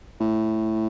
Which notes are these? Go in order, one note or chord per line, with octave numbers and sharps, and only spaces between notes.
A2